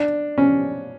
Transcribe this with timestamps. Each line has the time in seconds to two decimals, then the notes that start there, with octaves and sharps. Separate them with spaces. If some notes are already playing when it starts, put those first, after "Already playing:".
Already playing: D4
0.38 C#4